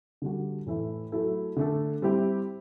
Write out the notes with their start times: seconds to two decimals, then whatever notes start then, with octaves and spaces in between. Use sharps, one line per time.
0.22 D3 G3 D4 F#4
0.66 A2 E3 A3 E4
1.12 F#3 A3 E4 A4
1.57 D3 A3 D4 A4
2.02 G3 C4 E4 G4